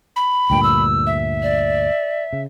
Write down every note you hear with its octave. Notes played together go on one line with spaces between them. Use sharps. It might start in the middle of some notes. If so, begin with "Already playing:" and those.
B5
D2 G2 A#2 G5
E6
E5
D5
C#3